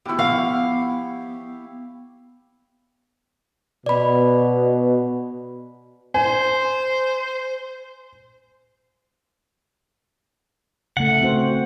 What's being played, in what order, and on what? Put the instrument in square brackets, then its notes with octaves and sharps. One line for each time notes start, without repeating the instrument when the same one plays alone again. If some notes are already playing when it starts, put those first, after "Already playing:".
[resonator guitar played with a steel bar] A2 F#4 [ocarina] B3 [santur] E4 G4
[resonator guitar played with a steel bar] F3 F#5 [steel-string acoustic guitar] F5 [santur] C#6
[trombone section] B2 [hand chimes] D5 B5
[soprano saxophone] C5 [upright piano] G#5
[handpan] C#3 A3 [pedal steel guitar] F#5
[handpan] C4 F#4 C5